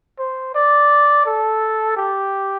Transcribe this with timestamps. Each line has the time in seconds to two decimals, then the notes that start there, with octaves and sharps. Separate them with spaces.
0.19 C5
0.54 D5
1.26 A4
1.97 G4